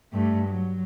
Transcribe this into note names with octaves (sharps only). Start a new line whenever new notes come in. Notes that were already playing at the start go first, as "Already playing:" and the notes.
G2 A3
F#3